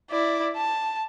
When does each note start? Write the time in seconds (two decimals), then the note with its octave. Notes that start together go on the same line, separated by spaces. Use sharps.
0.10 E4 D5
0.57 A5